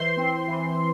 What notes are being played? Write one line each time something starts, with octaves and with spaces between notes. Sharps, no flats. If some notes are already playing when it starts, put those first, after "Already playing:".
Already playing: E3 C5 C6
C4
E3